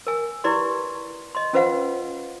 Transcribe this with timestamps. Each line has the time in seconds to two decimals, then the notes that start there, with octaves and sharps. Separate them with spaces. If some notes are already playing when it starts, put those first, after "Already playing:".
0.07 A#4 G#5
0.44 E4 G4 B4 D5 C6
1.35 D#5 C6
1.53 C#4 F4 B4 C5 F5 F#5